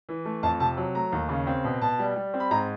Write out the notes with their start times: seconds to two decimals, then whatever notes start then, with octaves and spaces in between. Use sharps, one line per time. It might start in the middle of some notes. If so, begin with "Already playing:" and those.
0.09 E3
0.25 A3
0.43 F2 A5
0.60 C3 A5
0.77 F#3
0.95 A3 A#5
1.12 D#2
1.29 C#3
1.47 C4
1.64 B2
1.82 B2 A5
1.99 G3
2.16 G3
2.34 C4
2.40 B5
2.51 G#2 A#5